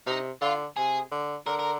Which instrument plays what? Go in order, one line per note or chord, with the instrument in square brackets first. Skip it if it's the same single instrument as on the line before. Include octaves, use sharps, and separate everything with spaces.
[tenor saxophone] C3 [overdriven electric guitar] D#4
[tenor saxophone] D3 [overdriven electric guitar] F4
[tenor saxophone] C3 [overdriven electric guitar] G#4
[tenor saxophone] D3
[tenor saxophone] D3 [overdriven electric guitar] A#4
[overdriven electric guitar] A#4